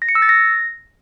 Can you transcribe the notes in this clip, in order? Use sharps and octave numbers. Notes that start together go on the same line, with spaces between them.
A#6
C#7
E6
A6
A#6